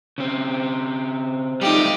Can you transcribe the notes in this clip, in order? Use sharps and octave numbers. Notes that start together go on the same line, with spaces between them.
C#3 C4
G3 A3 D#4 F4 G4